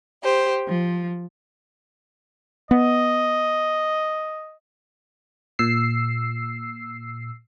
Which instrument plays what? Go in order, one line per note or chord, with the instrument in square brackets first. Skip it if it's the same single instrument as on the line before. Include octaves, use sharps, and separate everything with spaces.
[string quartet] G4 C5
F3
[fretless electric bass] B3 [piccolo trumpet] D#5
[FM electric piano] A#2 E6 C7